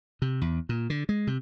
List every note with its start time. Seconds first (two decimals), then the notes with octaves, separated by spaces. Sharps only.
0.22 C3
0.41 E2
0.69 A#2
0.90 D3
1.09 G#3
1.27 C3